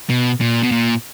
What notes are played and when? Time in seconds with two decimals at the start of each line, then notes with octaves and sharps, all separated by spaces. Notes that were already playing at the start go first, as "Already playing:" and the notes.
0.10 B2
0.41 A#2
0.63 B2
0.72 A#2